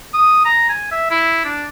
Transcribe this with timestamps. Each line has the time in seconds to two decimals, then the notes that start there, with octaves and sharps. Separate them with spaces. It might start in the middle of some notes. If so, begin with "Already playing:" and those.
0.13 D#6
0.45 A#5
0.69 G#5
0.91 E5
1.11 E4
1.45 D4